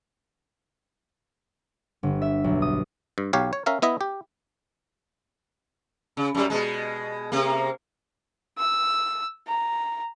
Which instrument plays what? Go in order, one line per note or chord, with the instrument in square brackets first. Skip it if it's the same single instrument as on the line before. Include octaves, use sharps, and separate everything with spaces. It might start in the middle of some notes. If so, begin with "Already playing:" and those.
[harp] G1
E5
B1
D#6
[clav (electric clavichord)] G2
B1 G4 C#5 F5
C#5
C#4 A#4 E5 F5
B3 E4 D#5 E5
G4
[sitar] C#3
F#2 G3
B2 G#3
C3 A#3
[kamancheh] E6
A#5